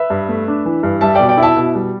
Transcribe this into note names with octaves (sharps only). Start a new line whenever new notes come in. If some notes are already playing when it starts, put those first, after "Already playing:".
Already playing: B4 E5
G2
A3
D4
E3
G2
G3 E5 A5
B2 D5 G5
D5 G5
E4
E5 A5
B2
G3